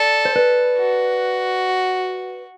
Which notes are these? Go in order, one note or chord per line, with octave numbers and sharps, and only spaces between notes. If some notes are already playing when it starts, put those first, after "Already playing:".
Already playing: A4 D5
C5
B4 D5
F#4